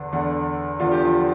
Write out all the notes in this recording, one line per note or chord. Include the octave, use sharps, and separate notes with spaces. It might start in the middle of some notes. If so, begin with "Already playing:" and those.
Already playing: E2 D3 D4
E2 D3
E2 D3 F4
G4
F3 F4